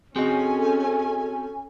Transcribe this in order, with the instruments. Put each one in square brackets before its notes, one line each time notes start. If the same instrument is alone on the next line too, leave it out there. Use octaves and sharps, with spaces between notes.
[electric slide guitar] C4 F#4 G5 [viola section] C#4 A4 [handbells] G#4 D#5 [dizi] G#5